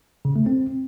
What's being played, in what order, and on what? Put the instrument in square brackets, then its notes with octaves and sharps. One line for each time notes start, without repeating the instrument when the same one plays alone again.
[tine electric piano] C#3
A3
C4